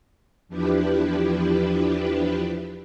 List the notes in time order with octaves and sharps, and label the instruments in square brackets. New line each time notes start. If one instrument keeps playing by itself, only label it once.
[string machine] E2 F3 D4 E4 G4 B4